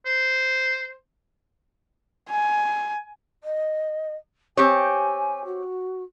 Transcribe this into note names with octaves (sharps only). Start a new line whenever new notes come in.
C5
G#5
D#5
C4 G4 C#5 G#5
F#4